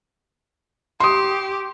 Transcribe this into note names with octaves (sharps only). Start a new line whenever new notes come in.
G4 C6 D#6